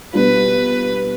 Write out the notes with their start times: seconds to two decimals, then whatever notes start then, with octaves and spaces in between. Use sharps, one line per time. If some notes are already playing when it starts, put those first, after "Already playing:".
0.13 B2 G3 D4 F4 B4